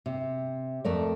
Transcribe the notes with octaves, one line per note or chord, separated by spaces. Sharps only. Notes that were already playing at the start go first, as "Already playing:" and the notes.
C3
F2 A3 A#4 D5